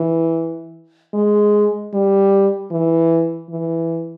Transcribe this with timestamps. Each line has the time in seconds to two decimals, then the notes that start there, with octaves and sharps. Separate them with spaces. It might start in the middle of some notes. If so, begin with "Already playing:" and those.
Already playing: E3
1.14 G#3
1.94 G3
2.71 E3
3.50 E3